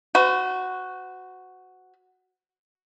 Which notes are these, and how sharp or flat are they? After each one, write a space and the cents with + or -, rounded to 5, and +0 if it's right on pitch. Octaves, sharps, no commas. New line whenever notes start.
F#4 +0 C5 -45